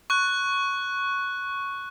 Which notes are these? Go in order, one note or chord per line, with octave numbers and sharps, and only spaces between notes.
C#6 F#6